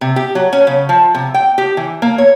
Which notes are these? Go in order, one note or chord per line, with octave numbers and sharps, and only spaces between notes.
C3
G4
F#3
C#4
C#3
F3
C3
G5
G4
E3
A#3
C#5